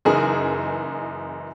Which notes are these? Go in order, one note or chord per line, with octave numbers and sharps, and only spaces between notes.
F#1 F#2 E3 D#4 G#4 A#4